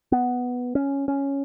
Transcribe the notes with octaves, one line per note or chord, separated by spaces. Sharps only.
B3
C#4
C#4